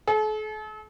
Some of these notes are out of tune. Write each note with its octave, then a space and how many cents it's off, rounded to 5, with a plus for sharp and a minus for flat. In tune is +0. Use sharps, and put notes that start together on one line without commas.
A4 -45